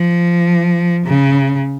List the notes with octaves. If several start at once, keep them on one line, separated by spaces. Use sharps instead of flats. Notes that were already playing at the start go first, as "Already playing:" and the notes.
Already playing: F3
C#3